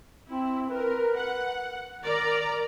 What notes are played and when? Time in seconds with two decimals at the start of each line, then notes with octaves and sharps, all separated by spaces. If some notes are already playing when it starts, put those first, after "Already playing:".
0.29 C4 E4
0.70 A#4 B4
1.17 F#5
2.02 D#3 A#4 D5 A#5